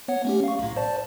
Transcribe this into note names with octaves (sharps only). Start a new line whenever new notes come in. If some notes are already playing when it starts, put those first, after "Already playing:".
B3 C#5 F#5
A3 C#4 G4
F5 C#6
B1 A2
C5 D5 A5